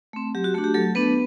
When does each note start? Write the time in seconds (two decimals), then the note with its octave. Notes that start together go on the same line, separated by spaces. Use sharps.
0.13 A3 C4
0.35 F#3 G4
0.44 F#4
0.54 A3 F#4
0.58 D4
0.64 G4
0.74 F#3 A3 A4
0.95 A3 B3 D4 B4